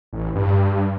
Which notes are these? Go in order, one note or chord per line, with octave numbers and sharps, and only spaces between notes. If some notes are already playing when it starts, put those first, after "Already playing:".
A1
G2